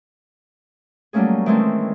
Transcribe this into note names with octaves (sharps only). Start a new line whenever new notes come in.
F#3 G3 A3 A#3 C#4 G#4
D#3 E3 G#3 A3 C4 C#4